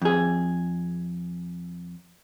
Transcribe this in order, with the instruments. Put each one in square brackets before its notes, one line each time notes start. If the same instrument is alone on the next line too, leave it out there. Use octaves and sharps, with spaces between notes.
[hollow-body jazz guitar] F2 G#4